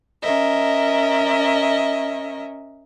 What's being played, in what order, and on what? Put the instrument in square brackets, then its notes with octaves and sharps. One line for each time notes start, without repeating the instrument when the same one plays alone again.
[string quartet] C#4 A#4 D#5 E5